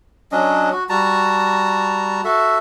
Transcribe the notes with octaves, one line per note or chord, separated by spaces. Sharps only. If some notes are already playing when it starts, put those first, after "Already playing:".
F#3 C#4 D4 D#5
F#4
G3 F#4 A5 A#5
F#4 A4 E5